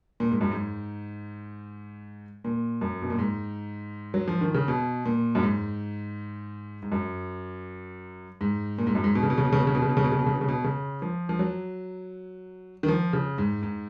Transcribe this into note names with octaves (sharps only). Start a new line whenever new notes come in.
A#2
G#2
F#2
G#2
A#2
F#2
B2
A#2
G#2
F#3
F3
D#3
C#3
B2
A#2
F#2
G#2
G#2
F#2
G#2
A#2
G#2
F#2
G#2
B2
C#3
B2
C#3
B2
C#3
B2
C#3
B2
C#3
B2
C#3
B2
C#3
B2
C#3
B2
C#3
B2
C#3
F3
F3
F#3
D#3
F3
C#3
G#2
G#2